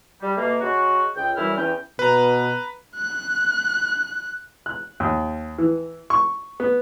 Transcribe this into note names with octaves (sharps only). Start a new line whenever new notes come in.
G3
B2 A3 A#3
C#3 G#3 F#4
C#2 G5
F#2 E3 G3 E4 F6
E2 E3 C#4 G5
B2 B4 A#5
F#6
F#6
D#2
E3
C#6
B3